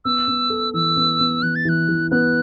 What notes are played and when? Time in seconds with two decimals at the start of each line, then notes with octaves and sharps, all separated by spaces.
0.05 B3 E6
0.28 B3
0.50 A4
0.74 E3 E6
0.97 B3
1.20 B3
1.42 E3 F#6
1.56 A6
1.65 E3 F#6
1.89 E3
2.11 B3 F#6